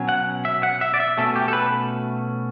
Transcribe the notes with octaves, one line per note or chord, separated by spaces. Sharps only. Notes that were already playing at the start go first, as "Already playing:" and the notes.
Already playing: B2 F#3 C#4
F#5
E5
F#5
E5
D5
E5
B2 A3 C#4 A4
G4
A4
B4